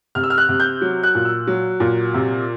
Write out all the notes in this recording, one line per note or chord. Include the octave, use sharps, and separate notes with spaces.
C3 F6
E6
F6
F#6
C3
G6
F#3
F#6
A#2
E6
F#3
A#2
C3